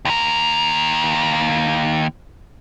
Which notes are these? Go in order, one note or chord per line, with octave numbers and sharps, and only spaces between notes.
D#2 A#4